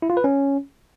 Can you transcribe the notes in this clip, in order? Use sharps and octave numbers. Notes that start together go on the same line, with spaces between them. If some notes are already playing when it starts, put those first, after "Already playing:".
E4
F4
B4
C#4